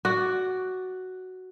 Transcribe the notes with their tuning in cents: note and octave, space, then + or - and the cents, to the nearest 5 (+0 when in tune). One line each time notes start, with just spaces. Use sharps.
F#4 +5 D5 +0